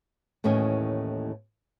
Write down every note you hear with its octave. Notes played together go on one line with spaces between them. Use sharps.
D#2 A2 E3 C#4 D#5 G#5